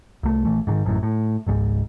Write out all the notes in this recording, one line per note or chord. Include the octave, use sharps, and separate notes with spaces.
C2 A3
A#1 E3 A3
G#2 D3 D#3
A1 F#2 A2
A2
G#1 C#2 G#2